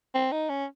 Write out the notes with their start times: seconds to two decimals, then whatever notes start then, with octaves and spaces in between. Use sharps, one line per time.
0.14 C4
0.32 D#4
0.49 C#4